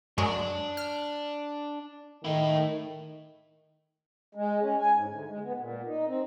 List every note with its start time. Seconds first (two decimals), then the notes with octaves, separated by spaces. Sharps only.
0.18 F#2 F#3 G#3 D4
0.77 F6
2.25 D#3 A3 E4
4.35 G#3
4.62 C#4
4.80 G#5
4.95 G#2
5.09 D2
5.29 G#3
5.44 B3
5.58 A#2
5.86 D#4
6.07 C4